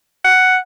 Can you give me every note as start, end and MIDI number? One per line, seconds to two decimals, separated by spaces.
0.25 0.57 78